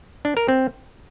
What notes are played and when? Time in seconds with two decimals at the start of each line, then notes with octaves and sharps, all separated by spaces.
0.25 D4
0.37 A#4
0.48 C4